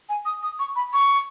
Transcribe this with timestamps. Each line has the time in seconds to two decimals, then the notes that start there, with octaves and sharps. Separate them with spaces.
0.09 G#5
0.25 D#6
0.43 D#6
0.59 C#6
0.76 B5
0.93 C#6